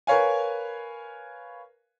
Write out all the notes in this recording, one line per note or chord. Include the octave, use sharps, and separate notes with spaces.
A#4 B4 C#5 F5 G#5